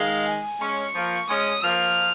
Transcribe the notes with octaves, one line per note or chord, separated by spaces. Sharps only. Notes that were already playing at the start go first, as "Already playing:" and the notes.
Already playing: D#3 G#3 F5
G#5
G#3 C#4 C#6
F3 A#3
G#3 C#4 D#6
F3 A#3 F6